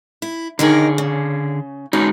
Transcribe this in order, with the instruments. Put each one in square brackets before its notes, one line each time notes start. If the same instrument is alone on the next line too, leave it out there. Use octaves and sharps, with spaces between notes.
[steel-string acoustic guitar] E4
[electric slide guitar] D3 G#4 [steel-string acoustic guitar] D#3 D#4 A#4
[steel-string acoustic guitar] C#3
[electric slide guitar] G#3 D#4 F#4 [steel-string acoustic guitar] C#4